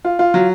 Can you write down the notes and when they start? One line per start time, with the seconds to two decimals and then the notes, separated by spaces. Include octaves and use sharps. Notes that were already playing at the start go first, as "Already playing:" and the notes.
0.05 F4
0.19 F4
0.34 F#3